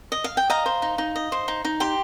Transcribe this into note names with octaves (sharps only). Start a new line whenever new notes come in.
D#5
F5
G5
D#5 F5 A#5
C5
D#4
D#4
D#5
C5
D#4
D#4
G4 G5 C6